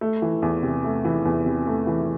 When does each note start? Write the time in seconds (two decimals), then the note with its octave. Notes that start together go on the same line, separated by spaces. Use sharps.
0.01 A3
0.22 E3
0.42 E2
0.63 C3
0.84 A3
1.05 E3
1.25 E2
1.46 C3
1.67 A3
1.87 E3